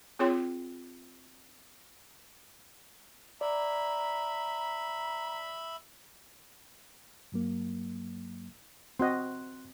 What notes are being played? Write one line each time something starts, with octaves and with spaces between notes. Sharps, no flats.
C4 F4 G#4 C#5 G5 C6
D5 E5 A#5 B5
G2 F#3 A#3
C4 F#4 D#5 C6 F#6